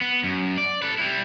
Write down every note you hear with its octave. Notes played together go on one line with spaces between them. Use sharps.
B3
F#2
D5
A4 B4
G3 E4